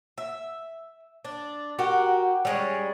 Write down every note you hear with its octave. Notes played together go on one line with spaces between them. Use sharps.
E5
D4
F#4 G4 A#4
G3 G#3 C#4